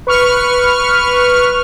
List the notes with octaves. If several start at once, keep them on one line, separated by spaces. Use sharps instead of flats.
B4 C#6 F6